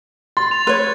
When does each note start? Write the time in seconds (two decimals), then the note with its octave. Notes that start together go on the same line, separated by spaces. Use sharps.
0.37 C6 A6
0.51 F7
0.67 B4 C#5